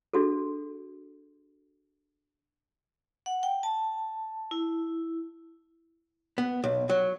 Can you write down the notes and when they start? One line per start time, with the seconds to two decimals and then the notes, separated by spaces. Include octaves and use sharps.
0.14 D4 F#4 G#4 A4
3.26 F#5
3.43 G5
3.63 A5
4.51 E4
6.38 B3
6.64 B1
6.89 F#3